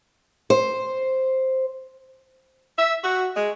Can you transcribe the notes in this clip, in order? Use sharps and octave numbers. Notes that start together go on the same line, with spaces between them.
C5
E5
F#4
G#3